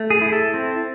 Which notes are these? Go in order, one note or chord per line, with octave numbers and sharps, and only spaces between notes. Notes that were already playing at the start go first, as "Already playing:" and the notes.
Already playing: A3
G#4
E4
A4
C4